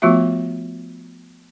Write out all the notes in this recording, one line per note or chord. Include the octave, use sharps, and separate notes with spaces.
F3 A3 B3 F4 F#4 E5